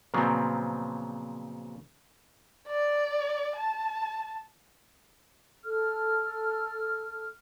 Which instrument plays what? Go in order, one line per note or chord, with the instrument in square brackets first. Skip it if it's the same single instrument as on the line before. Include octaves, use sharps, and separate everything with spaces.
[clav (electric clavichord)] A#2 C#3 F3 F#3 B3 C4
[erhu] D5
A5
[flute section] A4 F6